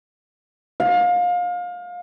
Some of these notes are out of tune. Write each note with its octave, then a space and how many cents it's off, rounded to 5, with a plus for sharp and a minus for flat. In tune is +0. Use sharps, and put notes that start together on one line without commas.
F5 +30